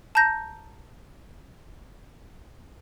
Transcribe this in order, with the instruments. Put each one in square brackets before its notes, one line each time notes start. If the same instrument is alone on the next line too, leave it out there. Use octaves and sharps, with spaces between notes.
[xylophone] A5 A#5 G6 A#6